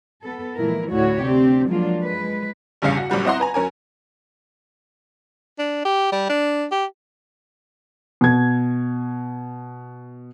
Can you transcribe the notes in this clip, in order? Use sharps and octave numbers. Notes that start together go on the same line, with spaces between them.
B3 A4
A#2 E3 F3 G#3 E4 A#4
D2 A2 D3 E4 F#4 C#5
C3 C4 D4 G4
F3 F#3 G#3 A#3 D4 F4
F3 G#3 B4
A1 E2 G2 C#3 F5 C#7
F#4
A#1 F#2 G3 F#5
C4 E4 D#5 F#5 A#5 C6
B4 G#5 A#5
F#2 C#4 A#4 G#5
D4
G4
G3
D4
G4
B2 G#6